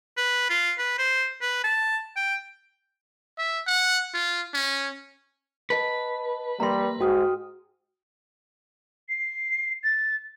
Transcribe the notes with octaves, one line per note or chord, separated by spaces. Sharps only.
B4
F4
B4
C5
B4
A5
G5
E5
F#5
F4
C#4
B4 D#5 A5 B5
G3 A#3 A#4 A#5 C6 A#6
G#2 F#4 G5 D#6 F6
C7
A6